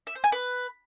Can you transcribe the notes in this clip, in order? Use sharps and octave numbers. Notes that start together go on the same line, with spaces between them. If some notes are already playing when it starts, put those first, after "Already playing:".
E5
C5
G#5
B4